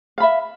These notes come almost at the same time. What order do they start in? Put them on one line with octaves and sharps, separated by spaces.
F5 B5 E5